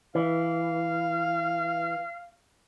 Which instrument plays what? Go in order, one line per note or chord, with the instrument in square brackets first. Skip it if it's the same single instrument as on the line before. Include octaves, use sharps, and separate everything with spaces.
[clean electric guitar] E3 [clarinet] F5